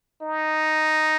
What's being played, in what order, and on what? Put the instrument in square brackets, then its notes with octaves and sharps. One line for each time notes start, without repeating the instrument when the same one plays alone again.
[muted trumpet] D#4